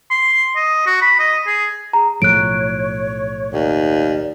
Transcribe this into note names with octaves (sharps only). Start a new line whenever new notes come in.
C6
D#5
F#4
B5
D#5
G#4
G#4 A#5
B1 A2 F3 C#5 F#6 D7
D#2 D5